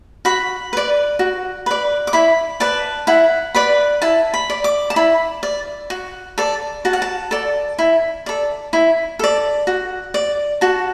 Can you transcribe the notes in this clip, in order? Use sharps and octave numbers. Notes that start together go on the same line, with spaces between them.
F#4 B5
B4 D5
F#4
B4 D5
D6
E4 B5
B4 D5 A5
E4 F#5
B4 D5 B5
E4 A5
B5
D5
D6
A5
E4 B5
D5
F#4
A4 D5
F#4 A5
F#5
A5
A4 D5
E4
A4 D5
E4
A4 D5
F#4
D5
F#4 A5